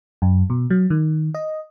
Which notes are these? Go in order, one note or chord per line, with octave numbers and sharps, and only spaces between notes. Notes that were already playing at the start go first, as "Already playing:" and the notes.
F#2
B2
F#3
D#3
D#5